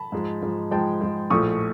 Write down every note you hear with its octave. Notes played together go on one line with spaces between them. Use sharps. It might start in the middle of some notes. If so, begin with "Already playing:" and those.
Already playing: A5 B5
G#2 F3 G#3
G#2 F3 G#3
G#2 F3 G#3 G5 A5
G#2 F3 G#3
A#1 A2 F3 A3 C#6 D#6